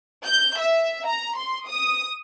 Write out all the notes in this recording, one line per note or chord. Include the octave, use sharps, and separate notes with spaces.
G6
E5
A#5
C6
D#6